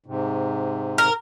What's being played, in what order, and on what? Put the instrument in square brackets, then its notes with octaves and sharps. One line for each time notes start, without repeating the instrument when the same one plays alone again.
[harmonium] G#2 C3
[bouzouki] A#4